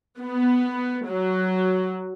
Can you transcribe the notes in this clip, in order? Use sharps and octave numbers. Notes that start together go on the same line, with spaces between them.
B3
F#3